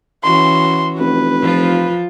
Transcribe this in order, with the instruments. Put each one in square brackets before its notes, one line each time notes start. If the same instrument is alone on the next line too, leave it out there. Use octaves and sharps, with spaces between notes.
[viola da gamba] E3 C#4 F#4 [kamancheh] C6
[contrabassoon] F1 [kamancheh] B4
[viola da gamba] F3 F4